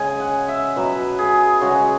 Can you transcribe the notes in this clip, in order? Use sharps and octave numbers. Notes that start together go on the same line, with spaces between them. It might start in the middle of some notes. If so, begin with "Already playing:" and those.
Already playing: C#3 G#3 G#5
F#5
E5
B2 F#3 B4
G#4
C#3 G#3 F#4